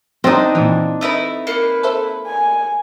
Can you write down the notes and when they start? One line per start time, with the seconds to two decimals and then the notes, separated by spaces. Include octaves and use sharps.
0.24 B3 C4 D4 D#4 E5 D#6 A#6
0.55 A#2 E3
1.01 A3 E4 B4 D#5 E5 A#5
1.47 A#3 B4 C7 C#7
1.83 A4 C5 E5
2.26 G#5